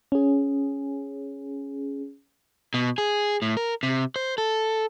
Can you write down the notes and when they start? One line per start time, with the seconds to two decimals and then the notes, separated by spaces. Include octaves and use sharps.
0.12 C#4 G#4
2.74 B2
2.98 G#4
3.42 A2
3.57 A#4
3.83 C3
4.16 C5
4.38 A4